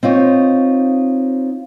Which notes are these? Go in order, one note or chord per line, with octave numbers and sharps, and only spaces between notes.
C4 D#4 F4 C#5